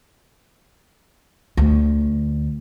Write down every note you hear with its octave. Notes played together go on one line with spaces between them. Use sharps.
D2 A3